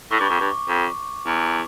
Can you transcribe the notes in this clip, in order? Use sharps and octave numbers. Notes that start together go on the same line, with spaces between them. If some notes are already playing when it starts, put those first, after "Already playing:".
A2 C#6
G2 D6
F2 C#6
G2
F2
E2